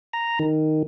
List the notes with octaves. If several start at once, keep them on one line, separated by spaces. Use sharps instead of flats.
A#5
D#3